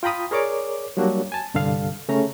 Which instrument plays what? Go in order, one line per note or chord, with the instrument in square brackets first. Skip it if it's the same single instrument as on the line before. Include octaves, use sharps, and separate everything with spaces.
[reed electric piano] F4 G5 A#5 B5 D#6
G#4 A#4 C#5 D5 D6
F#3 G3 A#3 D4 F#4
G#5 A5
C2 G2 D3 A4 F5
C#3 A3 C#4 A#5